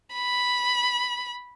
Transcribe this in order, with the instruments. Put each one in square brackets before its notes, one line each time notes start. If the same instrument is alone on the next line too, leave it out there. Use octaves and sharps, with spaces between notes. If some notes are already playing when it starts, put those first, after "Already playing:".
[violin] B5